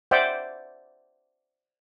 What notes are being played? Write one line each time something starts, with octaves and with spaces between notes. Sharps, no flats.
C5 D5 E5 F#5 G5